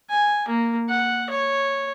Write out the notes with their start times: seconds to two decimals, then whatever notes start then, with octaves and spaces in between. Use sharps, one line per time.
0.10 G#5
0.48 A#3
0.89 F#5
1.30 C#5